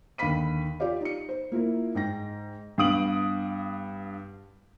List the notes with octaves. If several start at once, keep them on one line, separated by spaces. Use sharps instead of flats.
D#2 D3 F5 B5 B6 D#7
F4 G4 D5 F5
D#4 C#7
C5
A#3 E4 F4 A#4
G#2 G5 A#6
G2 B3 F5 D#6 D7 F#7